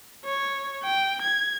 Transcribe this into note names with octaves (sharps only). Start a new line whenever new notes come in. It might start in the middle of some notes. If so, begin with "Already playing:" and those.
C#5
G5
G#6